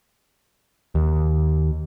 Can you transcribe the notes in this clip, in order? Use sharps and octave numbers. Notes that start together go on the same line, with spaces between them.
D#2